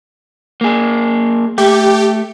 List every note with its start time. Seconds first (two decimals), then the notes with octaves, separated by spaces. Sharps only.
0.61 A#3 G#4
1.58 A3 G4